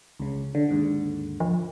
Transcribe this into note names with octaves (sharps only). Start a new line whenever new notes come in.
C#2 C#3
D3
D#2 G#2 D3
F3